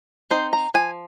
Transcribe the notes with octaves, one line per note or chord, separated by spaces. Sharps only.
C4 D#4 C5
A#5
F3 G#5